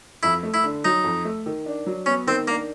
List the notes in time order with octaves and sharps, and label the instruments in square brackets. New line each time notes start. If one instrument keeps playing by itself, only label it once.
[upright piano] F2 [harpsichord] E4
[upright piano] A3
[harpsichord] E4
[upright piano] D3
[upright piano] F#3 [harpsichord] D#4
[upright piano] F2
A3
D#3
D4
F#3
[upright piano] B3 [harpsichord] C#4
[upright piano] D#3 [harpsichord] C4
[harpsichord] A#3 [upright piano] D4